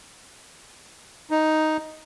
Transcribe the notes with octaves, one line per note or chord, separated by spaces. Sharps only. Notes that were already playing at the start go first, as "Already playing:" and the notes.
D#4